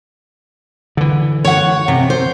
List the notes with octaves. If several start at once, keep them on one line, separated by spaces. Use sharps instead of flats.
D3 E3
C#5 F#5
C3
C5